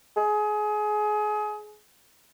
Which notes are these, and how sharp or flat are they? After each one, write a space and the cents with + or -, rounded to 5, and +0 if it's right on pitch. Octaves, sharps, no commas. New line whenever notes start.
G#4 +25